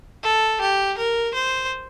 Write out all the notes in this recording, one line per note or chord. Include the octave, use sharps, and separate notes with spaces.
A4
G4
A#4
C5